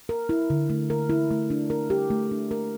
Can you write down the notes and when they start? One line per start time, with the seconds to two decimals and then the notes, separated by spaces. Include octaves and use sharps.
0.09 A#4
0.29 E4
0.50 D3
0.70 A3
0.90 A#4
1.10 E4
1.31 A3
1.50 D4
1.70 A#4
1.90 G4
2.11 A3
2.31 D4
2.51 A#4